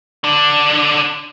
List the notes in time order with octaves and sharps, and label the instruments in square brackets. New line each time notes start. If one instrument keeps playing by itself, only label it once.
[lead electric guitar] D3 D4